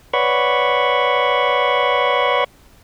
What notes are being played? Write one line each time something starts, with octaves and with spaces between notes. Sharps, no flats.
B4 C#5 D5 F#5 B5 C#6